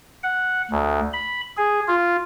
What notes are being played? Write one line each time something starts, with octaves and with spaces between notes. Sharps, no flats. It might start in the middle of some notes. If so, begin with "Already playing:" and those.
F#5
D2
B5
G#4
F4